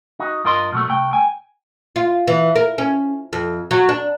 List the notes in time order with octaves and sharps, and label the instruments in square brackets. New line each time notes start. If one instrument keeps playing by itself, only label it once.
[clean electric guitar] D#4 F#4 D#5
G2 F4 A#4 D#5 C6
B2 F#3 A3
C2 A3 G5
G5 G#5
[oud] F4
E3
A#4
C#4
F2
F#3
D4